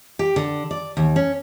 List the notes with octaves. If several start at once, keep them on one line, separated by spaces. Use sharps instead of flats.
G4
D3
D5
D#2
C#4